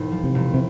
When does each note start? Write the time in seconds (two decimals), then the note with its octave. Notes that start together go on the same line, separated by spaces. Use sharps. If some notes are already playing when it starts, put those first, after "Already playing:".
Already playing: E1 G#2
0.12 F3
0.24 C3
0.35 E1
0.54 C3